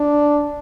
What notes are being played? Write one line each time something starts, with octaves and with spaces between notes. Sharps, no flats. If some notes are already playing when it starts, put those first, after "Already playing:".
Already playing: D4